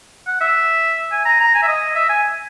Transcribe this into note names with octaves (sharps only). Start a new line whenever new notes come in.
F#5
E5
G#5
A#5
A#5
G#5
E5
D#5
E5
G#5